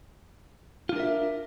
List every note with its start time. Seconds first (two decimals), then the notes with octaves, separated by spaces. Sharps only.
0.89 F4
0.93 D4
0.96 A#4
1.00 E5